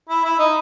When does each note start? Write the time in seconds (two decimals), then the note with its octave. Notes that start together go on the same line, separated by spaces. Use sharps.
0.09 E4
0.24 E4
0.39 D#4